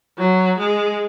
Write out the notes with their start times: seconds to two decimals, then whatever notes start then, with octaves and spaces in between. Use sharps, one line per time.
0.18 F#3
0.59 G#3